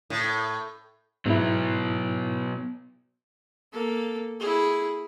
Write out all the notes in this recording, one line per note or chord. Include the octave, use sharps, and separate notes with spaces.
A2
G#2 B2 F#3 B3 E4
A#3 A4
E4 G#4